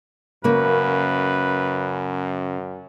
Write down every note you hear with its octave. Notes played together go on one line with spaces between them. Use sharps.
F#2 C#3 A#3 B4